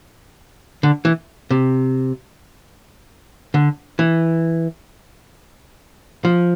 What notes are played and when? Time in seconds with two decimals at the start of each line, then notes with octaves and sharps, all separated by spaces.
0.83 D3
1.05 E3
1.51 C3
3.54 D3
3.99 E3
6.25 F3